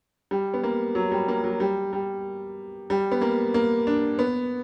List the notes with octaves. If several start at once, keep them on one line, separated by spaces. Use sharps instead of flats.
G3
B3
A#3
F#3
G3
A#3
F#3
G3
G3
G3
B3
A#3
A#3
D4
B3